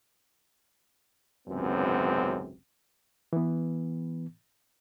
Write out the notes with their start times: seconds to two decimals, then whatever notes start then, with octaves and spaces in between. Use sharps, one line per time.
1.48 G#1 C#2 F#2 C3 B3 C4
3.33 E3 B3